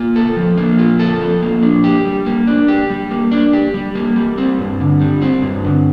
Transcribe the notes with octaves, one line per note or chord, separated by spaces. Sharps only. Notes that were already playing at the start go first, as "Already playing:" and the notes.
Already playing: A#3 F4
A4
F3
A#3
F4
A4
F3
A#3
D4
G4
G3
A#3
D4
G4
G3
A#3
D4
G4
G3
A#3
G3
C4
G2
D3
G3
C4
G2
D3